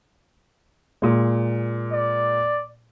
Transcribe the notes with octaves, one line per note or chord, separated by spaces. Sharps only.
A#2 G#3
D5